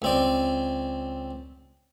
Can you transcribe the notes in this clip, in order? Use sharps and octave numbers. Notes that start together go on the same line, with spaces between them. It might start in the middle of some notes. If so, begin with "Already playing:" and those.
C#2 C4 D5